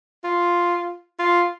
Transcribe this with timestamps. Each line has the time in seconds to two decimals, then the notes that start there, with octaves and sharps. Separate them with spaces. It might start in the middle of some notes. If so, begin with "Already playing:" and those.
0.24 F4
1.19 F4